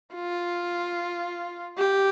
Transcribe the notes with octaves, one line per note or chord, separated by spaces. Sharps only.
F4
G4